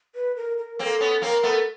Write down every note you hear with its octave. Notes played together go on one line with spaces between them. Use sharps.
B4
A#4
A#4
A#3 C4 A4
B3 C#4
A#3 C4 A#4
A3 B3